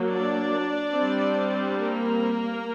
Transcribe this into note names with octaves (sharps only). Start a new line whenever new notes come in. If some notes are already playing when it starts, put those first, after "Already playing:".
Already playing: F#3 A#3
D4 D5
G3 C4
A#3 A#4